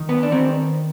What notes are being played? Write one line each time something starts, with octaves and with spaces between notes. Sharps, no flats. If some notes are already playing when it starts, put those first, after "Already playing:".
Already playing: D#3
B3
D4
D#3 C4